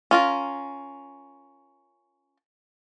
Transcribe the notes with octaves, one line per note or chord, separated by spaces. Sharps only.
C#4 F4 A#4